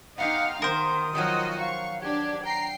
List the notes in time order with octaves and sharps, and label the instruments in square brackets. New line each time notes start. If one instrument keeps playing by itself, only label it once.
[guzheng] B3 F4 G4 [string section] D#4 F5 [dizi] F#5
[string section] D#3 [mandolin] A#4 C5 [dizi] D#6
[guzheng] D#3 F3 F#3 [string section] F4 F#4 D#5
[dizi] F5 [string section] C#6
[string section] D4 G4 [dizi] G#6
[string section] G5 C7 [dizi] A#5